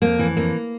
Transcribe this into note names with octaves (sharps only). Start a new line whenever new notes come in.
F2 A#3
E3
F2 A#3